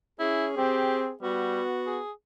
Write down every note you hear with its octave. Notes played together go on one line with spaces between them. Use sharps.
C#4 E4 G#4
C4 G4
G3 B3 F#4
G#4